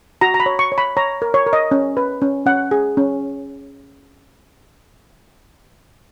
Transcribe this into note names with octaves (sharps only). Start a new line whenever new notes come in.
F#4 A#5
A#5
B5
C#5
C#6
C#5
B5
C#5 A#5
A#4
C#5
A#4
D#5
C#4
B4
C#4
C#4 F#5
G#4
C#4